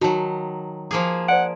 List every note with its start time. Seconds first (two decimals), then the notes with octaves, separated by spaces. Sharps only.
0.01 D#3 F#3 F#4 A5
0.91 F3 A#3 G#4
1.28 C5 D5 F#5 D7